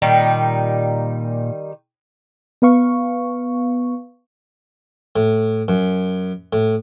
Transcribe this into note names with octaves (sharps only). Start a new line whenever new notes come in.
A#2 D#3 G3 D#4
B3 B4 F5 C#6
A2
F#2
A2